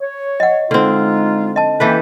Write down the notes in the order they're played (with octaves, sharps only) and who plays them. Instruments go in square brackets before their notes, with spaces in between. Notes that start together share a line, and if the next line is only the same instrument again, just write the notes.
[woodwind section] C#5
[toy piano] D#5 F#5
[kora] D3 C4 [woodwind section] G#3 D#4 F4
[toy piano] D#5 A5
[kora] E3 A4 B4 [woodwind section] A#3 C#4 G5